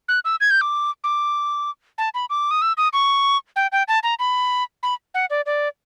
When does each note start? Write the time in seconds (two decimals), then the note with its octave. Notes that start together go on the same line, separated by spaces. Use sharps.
0.09 F#6
0.25 E6
0.41 G#6
0.51 G6
0.61 D6
1.04 D6
1.98 A5
2.14 B5
2.30 D6
2.51 D#6
2.62 E6
2.77 D#6
2.93 C#6
3.56 G5
3.72 G5
3.88 A5
4.03 A#5
4.19 B5
4.83 B5
5.14 F#5
5.30 D5
5.46 D5